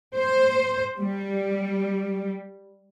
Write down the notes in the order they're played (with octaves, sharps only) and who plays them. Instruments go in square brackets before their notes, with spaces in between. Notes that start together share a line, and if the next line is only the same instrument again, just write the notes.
[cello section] C5
G3